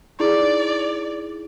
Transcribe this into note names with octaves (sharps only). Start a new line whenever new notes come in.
D#4 E4 G#4 D5